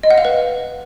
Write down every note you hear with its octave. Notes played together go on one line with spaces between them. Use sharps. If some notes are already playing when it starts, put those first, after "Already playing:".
D#5
F#5
F5
B4